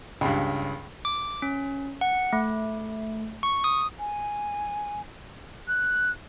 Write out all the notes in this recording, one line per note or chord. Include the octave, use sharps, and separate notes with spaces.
C#2 G2
D6
C#4
F#5
A3
C#6
D#6
G#5
F#6